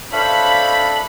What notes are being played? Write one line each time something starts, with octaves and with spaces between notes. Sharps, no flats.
D4 A4 C5 C#5 E5 F5 B5